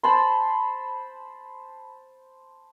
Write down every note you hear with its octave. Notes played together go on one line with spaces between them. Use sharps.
C5 A5 B5 C6